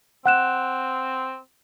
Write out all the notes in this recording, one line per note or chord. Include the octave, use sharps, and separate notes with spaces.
C4 F#5 F#6 E7